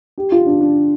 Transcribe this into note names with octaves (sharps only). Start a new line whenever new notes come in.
G4
F4
D4
D4